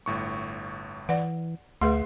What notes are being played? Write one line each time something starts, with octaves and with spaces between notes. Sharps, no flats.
G1 A2 C#6
E3 D5 F#5
D2 A3 G#4 B4 E5 F#5 C6